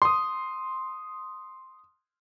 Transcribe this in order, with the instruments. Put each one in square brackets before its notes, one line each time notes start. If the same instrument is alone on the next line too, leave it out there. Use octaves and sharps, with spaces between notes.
[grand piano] C6 D#6